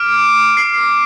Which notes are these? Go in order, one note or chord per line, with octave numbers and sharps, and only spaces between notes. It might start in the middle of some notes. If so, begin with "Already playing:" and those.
Already playing: D6 F6 D7
C7